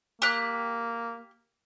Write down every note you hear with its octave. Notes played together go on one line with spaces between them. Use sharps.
A#3 G4 F#6